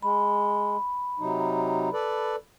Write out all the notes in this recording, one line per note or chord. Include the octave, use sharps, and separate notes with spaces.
G#3 B5
C3 F#3 D#4
A4 B4 D5